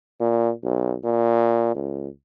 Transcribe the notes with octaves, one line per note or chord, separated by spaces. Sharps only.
A#2
B1
A#2
C#2